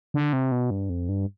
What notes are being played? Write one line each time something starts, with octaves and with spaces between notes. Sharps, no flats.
D3
C3
B2
G2
F2
G2